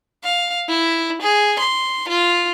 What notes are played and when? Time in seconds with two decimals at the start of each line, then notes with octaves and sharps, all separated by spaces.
0.24 F5
0.69 E4
1.22 G#4
1.60 C6
2.09 F4